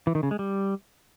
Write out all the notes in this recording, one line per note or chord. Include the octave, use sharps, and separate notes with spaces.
E3
D#3
C#3
G#3
G3